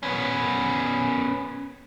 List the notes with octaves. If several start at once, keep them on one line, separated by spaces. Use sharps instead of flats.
B3 C#4